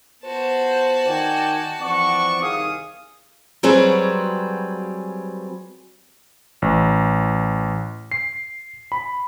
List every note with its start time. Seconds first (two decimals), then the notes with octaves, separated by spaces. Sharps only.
0.23 B3 F4 F#4 C5 A5
1.07 D#3 D5 G5 G#5
1.81 E3 F3 C4 D5 F#5 C#6
2.42 C2 D#3 G#4 F5 D#6
3.63 F#3 G3 C4 F#4 G#4 B4
6.62 A1
8.12 C7
8.92 B5